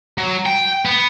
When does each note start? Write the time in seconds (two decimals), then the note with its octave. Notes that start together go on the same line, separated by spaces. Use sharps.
0.18 F#3
0.46 G5
0.85 B3